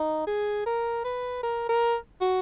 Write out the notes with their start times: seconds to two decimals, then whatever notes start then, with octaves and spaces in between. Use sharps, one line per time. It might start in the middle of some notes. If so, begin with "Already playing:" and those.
Already playing: D#4
0.27 G#4
0.66 A#4
1.05 B4
1.43 A#4
1.69 A#4
2.21 F#4